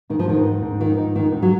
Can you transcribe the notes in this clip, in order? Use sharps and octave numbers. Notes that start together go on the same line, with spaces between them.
G#2 D#3
F3
G#2 D#3
D#4
G#2
D#3 F3
D#4
G#2 D#3
G#2
F#3